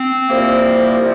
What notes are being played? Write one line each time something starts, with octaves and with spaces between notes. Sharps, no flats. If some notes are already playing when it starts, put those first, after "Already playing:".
Already playing: C4
C2 C3 F3 A#3